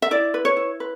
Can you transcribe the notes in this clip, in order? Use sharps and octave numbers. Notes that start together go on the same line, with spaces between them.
E5
E4 D5
B4
C#5
E4
B4